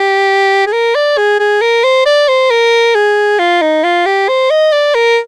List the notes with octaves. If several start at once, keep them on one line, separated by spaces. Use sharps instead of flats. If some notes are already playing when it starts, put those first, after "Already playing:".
Already playing: G4
G#4
A#4
D5
G#4
G#4
A#4
C5
D5
C5
A#4
G#4
F4
D#4
F4
G4
C5
D#5
D5
A#4